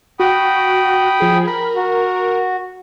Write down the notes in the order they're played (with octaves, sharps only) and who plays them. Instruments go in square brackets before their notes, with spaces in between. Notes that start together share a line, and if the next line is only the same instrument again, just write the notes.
[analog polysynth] F#4 [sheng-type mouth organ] G5 B5 D#6
[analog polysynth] F3 G#4
[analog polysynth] A#4 [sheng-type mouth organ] B5
[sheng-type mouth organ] F#4